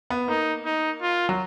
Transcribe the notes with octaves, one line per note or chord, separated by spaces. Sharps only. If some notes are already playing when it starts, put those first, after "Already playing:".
B3
A#3 D#4
D#4
F4
F#3